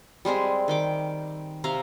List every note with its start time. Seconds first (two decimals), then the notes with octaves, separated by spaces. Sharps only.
0.25 G3 G#3 C4 G#4
0.68 D#3 G5 D6
1.64 C3 E5 F5 A#5